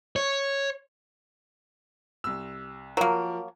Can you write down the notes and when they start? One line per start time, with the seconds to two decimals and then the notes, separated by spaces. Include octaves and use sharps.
0.16 C#5
2.24 C2 E6
2.97 F3 F#3 A#3 A#4